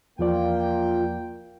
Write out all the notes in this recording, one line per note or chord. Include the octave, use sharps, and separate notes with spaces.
E2 F3 A#3 F4 D5 G5